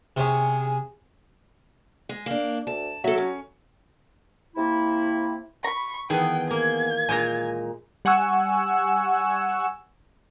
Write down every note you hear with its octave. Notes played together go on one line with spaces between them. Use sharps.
C3 C#4 G#4
G#3
A#3 D4
D2 A5
F#3 A4 E5
C#4
C3 A#3 E4
A#5 B5 C#6
D#3 E3 B3 G#4 G5 A5
A#3 G#6
A#2 G#3 G#5 A#5
G3 F#5 G#5 C#6 E6